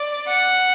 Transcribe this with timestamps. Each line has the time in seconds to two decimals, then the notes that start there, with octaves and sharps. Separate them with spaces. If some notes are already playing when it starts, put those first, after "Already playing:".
Already playing: D5
0.28 F#5